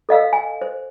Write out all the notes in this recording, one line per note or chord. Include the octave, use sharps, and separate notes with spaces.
A4 D#5 F5 E6
G#5
C5